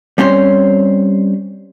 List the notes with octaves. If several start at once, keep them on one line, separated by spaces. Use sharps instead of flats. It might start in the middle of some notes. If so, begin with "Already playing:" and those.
G3 C4 C#4 C5 C#5